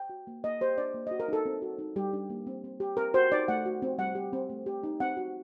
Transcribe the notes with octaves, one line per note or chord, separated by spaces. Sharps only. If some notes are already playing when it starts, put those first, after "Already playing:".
Already playing: G5
F#4
A#3
A#3 D#5
G4 C5
D4 D5
A#3
F#4 D#5
A#4
D#4 A4
C4
F#4
D#4
G3 G4
D4
A#3
C4
C4
G4
C4 A#4
F#4 C5
D#4 D5
A3 F#5
F#4
C4
G3 F#5
G4
C4
A3
G4
D#4
C4 F#5
F#4